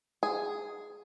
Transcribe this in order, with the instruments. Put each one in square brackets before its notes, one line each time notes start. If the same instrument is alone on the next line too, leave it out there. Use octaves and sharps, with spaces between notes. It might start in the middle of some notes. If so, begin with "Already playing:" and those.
[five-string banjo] G#4